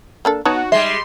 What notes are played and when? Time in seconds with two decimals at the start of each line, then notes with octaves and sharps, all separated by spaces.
0.25 A#3 D4 A4
0.45 B3 D#4 F#4 C#5 A5
0.72 G3 G#3 E5 C6